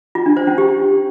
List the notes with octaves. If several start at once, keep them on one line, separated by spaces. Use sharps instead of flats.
F4
D4
C5
C#4
G4